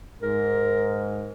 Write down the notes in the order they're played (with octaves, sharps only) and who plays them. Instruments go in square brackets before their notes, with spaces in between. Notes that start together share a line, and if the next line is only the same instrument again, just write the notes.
[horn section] G#2 [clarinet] A#4